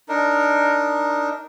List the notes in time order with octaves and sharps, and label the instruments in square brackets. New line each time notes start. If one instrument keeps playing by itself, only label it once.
[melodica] D4 D#4 A#4